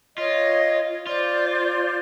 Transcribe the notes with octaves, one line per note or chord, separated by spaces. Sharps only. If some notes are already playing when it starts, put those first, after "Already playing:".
F4 C#5 D#5
F4 C5 D5